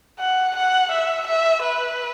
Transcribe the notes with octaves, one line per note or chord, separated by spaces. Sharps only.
F#5
F#5
E5
E5
B4